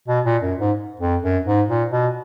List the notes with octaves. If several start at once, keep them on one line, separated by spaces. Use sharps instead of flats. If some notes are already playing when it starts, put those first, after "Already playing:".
B2
A#2
F#2
G#2
F2
F#2
G#2
A#2
B2